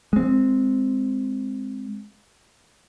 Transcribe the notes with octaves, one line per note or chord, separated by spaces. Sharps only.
G#3 C4